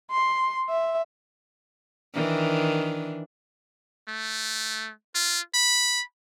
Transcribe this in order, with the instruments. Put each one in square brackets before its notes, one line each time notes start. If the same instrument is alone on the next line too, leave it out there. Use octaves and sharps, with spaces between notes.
[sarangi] C6
E5
[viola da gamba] D#3 E3 D4
[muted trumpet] A3
F4
B5